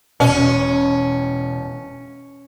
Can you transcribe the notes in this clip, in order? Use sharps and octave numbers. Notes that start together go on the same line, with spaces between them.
E1 B2 C#4